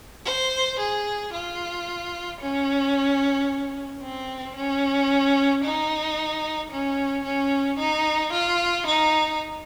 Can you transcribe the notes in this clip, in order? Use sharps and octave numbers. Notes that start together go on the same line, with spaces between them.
C5
G#4
F4
C#4
C4
C#4
D#4
C#4
C#4
D#4
F4
D#4